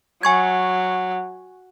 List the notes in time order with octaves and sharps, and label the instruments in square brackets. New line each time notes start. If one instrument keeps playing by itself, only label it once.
[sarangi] F#3 [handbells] G#5 C#6 G#6